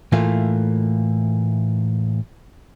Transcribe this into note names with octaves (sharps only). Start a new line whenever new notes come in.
A2 E3 A3 A#3 F4